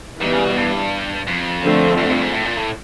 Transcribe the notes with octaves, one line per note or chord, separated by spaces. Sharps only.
D#3 E3 G3 B3
C#3
B2
G2
F2
D3 F3 A3 C4
F#2
G2
G#2
A2
A#2
A2